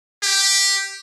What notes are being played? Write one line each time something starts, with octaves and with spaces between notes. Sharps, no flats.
G4